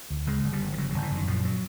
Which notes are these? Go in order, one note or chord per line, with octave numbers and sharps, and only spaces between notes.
D2
C#3 G#3
G1
G3
G1
F3
C#3 F#3
G1 F#3
E3
F#2 D#3
A#1 F3
F#3